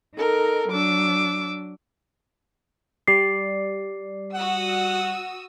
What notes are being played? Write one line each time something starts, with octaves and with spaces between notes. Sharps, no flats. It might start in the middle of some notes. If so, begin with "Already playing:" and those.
D#4 A4 A#4
F#3 D4 D6 E6
G3 D5 C7
F#4 F#5 D#6 E6